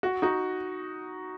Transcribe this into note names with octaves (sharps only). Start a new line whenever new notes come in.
F#4
D#4 F#4